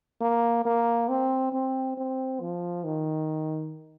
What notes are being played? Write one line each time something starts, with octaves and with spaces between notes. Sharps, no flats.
A#3
A#3
C4
C4
C4
F3
D#3